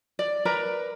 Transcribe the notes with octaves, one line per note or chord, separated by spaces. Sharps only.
D5
A#4 B4 D5 A#5